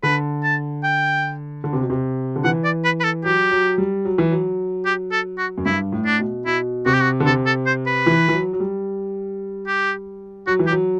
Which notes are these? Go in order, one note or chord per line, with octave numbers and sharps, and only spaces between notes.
D3 B4
A5
G5
D3
C3
B2
C3
D3
E3 F#5
D5
B4
B4
A4
F#3 G4
F#3
G3
F#3
E3
F#3
G4
A4
F#4
F#2
G2 E4
A2
D4
B2
B2 E4
C3 F#4
G4
F#4
D3
C3 A4
A4
C5
B4
E3
E3
F#3
F#3
G3
G4
F#3 F#4
E3
G4
F#3